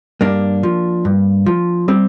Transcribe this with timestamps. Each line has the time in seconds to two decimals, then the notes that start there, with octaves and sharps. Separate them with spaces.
0.21 G2 A#3 D4
0.63 F3
1.05 G2
1.46 F3
1.88 G3 C4